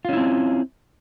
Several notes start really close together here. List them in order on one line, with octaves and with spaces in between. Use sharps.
F4 C#4 E4 C4